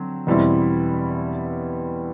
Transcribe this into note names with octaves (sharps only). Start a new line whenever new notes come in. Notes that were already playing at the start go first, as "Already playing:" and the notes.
Already playing: D3 F#3 C4
E2 B2 G3 C4 E4